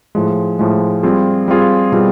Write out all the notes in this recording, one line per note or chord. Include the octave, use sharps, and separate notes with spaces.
A2 F3 G#3
A2 F3 G#3
G3 C4 F4 G#4
G3 C4 F4 G#4
B2 G3 C4 F4 G#4